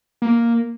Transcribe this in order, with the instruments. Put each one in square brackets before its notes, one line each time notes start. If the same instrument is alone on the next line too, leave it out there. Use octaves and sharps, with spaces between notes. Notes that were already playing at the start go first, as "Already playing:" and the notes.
[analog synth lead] A#3